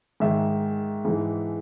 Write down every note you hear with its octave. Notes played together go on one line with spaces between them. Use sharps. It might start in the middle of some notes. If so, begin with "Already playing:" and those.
G#2 D#3 G#3 E5
G#2 E3 G#3